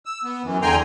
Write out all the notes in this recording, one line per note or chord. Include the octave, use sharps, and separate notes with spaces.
E6
B3
F#2 E3
E2 D3 G5 G#5 A#5 C6